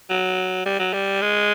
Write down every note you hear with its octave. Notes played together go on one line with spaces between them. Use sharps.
F#3
G3
F#3
G3
G#3